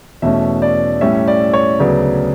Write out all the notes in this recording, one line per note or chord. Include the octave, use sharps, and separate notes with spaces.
E2 B2 A3 C#4 E5
D5
A2 G3 C#4 E5
D5
C#5
D2 C#3 F#3 B3 D5